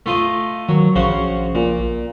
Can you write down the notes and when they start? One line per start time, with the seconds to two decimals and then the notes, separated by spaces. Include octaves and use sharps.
0.06 A3 F4 D#5
0.69 D#3 F#3
0.96 A#1 C#3 F#4 C5
1.55 A#2